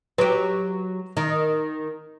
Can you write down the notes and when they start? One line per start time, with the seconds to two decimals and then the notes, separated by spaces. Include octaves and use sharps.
0.18 F#3 G4 B4
1.17 D#3